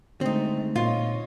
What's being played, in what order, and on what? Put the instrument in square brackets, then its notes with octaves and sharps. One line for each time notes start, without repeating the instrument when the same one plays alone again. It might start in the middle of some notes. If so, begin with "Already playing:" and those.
[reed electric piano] D3 [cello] G#3 A3 [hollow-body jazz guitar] C4 D#4
[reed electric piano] A#2 [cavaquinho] F4 [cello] C#5 D#5